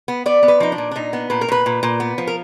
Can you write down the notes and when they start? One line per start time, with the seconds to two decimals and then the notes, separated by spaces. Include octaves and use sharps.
0.08 B3
0.26 B3 D5
0.43 B3
0.48 B4
0.60 F3 D#4
0.72 D4
0.78 A#2
0.91 D4
0.96 A#2 D#4
1.13 B3
1.30 A#2 B4
1.41 A#4
1.48 A#2 B4
1.66 A#2
1.83 A#2
2.00 B3
2.18 F3
2.27 A#4